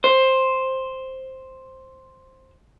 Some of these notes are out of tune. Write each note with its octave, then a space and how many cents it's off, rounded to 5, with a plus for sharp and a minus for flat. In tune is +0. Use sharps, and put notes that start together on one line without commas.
C5 +5